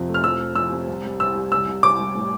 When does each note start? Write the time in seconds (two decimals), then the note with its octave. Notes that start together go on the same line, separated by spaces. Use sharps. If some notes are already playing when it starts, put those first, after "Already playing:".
Already playing: F2 C3 F3
0.08 A3
0.14 F6
0.24 F3 E6
0.40 A3
0.55 F3 E6
0.72 C3
0.87 C2
1.04 G3
1.19 C2 E6
1.35 G3
1.52 C2 E6
1.67 C2
1.83 C2 D6
1.99 G3
2.15 A2